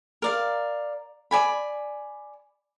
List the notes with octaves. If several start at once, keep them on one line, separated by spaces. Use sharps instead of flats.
A#4 D5 F5
D5 G#5 B5